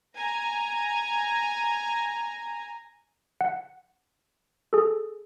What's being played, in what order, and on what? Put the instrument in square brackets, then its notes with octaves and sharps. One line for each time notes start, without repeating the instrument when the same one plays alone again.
[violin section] G#5 A#5
[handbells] F#5
G#4 A4